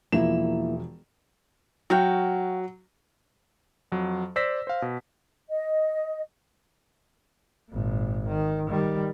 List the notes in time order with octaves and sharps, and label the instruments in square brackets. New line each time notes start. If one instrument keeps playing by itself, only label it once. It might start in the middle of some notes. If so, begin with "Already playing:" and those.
[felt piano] E1 F3 E7 [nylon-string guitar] A#3 E4
[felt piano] F#3 [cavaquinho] F#4 F5 G5
[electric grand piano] F2 F#3
C5 D5 E6 A#6 B6
C5 F5
B2
[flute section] D#5
[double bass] G#1 A#2
D#3
D#3 G3